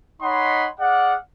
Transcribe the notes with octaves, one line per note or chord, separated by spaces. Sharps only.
D#4 C#5 D#5 F#5 B5 C6
G#4 D5 F5 F#5